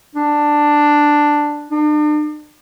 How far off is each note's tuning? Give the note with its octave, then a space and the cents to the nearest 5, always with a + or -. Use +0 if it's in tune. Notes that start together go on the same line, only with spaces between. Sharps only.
D4 +5
D4 +40